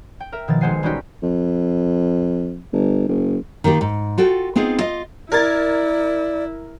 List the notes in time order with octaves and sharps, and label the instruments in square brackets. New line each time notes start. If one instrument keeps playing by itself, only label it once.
[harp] G5
A#4 E5
B2 D#3 F3 A6
B1 G#3 C5 F#5 G#5 C7
G3 G#3 C#4 D#4 F#4 G4
[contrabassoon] F2
G1
F#1
[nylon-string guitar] D#3 A#3 F4 G4
G#2
F4 F#4 A4 G5
B3 C4 D#4 F4 G#4
F4 D#5
[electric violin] E4 [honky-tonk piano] A#4 G#6 A6 [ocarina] D5